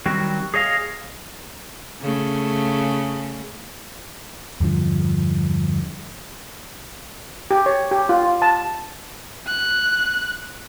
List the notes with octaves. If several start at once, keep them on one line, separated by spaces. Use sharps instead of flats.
D#3 F#3 G3 C4 F#4
G#4 C#5 D#5 F5
C#3 A3
E2 G2 D3 F3
G4
C#5
G4
F4
A5
F#6